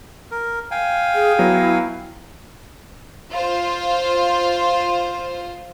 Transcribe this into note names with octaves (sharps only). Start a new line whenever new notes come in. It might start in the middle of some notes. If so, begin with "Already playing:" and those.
A#4
F5 G5 G#5
G#4
F#3 B3 E4
F4 C5